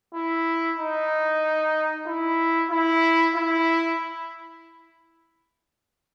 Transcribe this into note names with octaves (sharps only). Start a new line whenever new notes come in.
E4
D#4
E4
E4
E4